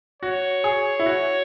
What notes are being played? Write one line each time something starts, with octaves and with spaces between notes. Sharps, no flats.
F#4 C#5
G#4
E4
F#4